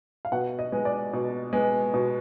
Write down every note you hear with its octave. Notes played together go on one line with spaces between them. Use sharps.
F5
B2 F#5
D#5
G#3 B3
D5
B2
G#3 B3
B2